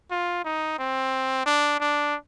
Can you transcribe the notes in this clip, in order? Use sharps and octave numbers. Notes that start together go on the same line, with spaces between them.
F4
D#4
C4
D4
D4